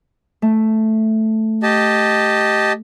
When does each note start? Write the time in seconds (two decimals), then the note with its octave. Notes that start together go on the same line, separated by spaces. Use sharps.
0.42 A3
1.63 G4 D#5 A5